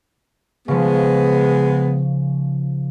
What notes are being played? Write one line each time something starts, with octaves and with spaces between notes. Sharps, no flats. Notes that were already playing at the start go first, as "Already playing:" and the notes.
C#3 F3 G#3 B3